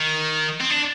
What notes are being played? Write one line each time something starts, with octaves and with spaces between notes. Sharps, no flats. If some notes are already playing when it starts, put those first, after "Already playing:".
Already playing: D#3
C4
D4